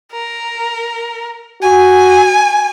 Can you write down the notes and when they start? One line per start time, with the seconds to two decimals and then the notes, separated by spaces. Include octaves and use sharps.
0.12 A#4
1.62 F#4 G#5